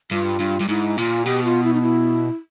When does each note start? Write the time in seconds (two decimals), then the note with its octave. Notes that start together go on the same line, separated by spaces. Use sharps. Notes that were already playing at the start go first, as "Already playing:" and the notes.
0.11 G2 F4
0.40 G2
0.61 G2
0.69 G#2 E4
0.97 A#2 F4
1.25 B2 G4
1.44 F4
1.63 E4
1.74 D#4
1.82 E4